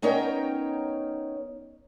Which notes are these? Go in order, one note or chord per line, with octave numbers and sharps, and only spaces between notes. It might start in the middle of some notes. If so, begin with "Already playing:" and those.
B3 C#4 D#4 A#4 C#5 G5